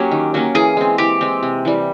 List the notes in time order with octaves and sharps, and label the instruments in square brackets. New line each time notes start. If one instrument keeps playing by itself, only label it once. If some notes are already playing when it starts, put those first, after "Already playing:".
Already playing: [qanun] F#3 A#3 C#4 [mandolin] G4
[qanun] D#3
F#3 A#3 C#4
[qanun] E3 [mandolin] G#4
[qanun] G#3 C4
[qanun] E3 [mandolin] G4
[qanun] G#3 C4
C3
E3 G3